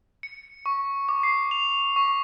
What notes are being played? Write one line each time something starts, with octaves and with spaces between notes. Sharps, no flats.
C#7
C#6
D6
C7
F7
C#6